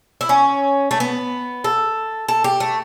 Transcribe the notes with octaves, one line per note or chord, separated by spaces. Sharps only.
E4
C#4
A3
B3
A4
A4
G4
A3